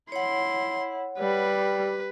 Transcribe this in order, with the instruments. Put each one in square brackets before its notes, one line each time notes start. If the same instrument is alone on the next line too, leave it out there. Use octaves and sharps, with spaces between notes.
[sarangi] E4 [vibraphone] C#5 F#5 [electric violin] C6
[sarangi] G3 [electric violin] B4